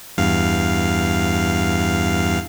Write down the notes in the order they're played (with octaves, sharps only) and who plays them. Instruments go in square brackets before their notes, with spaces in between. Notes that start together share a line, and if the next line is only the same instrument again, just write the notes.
[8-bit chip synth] E2 G2 F5